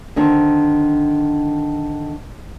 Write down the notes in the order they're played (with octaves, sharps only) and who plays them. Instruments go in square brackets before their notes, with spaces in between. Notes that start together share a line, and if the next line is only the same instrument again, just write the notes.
[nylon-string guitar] D3 D#3 C4